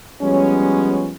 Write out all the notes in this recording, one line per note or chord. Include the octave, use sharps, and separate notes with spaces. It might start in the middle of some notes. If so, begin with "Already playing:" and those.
F3 G3 G#3 B3 C#4